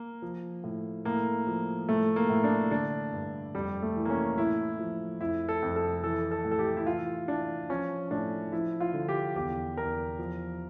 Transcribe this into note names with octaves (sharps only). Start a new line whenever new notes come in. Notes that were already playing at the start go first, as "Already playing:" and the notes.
Already playing: A#3
F3
A2
A2 A#3
F3
A2 A3
A#3
A2
D4
D3 D4
G2
F2 G3
A3
E3
A#3
C#4
A2 E4
F3
F2 E4
A4
F2
A4
E3 A4
A4
A2
A4
G4
E4
E3 F4
E3 D4
F3 C#4
A2 D4
F3 E4
F4
D3
G4
E2 G4
E2 A#4
F3